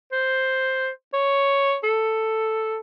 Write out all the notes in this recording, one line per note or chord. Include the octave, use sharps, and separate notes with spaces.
C5
C#5
A4